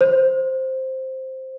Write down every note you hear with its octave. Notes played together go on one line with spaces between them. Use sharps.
C5